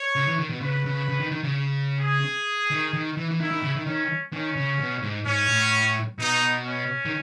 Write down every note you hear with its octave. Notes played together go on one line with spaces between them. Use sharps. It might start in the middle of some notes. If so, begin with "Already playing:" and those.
Already playing: C#5
C#3
E3
D#3
B2
C#3 B4
C#3
C#3
D#3
D#3
C#3
G#4
D#3
D#3
E3
E3
D#3 E4
D#3
C#3
D#3
D#3 C#4
D#3 C#4
C#3
B2
G#2
G#2 C#4
A2
B2 D#4
C#4
D#3